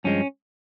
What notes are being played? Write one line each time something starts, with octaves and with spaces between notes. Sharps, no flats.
G2 F3 G#3 C#4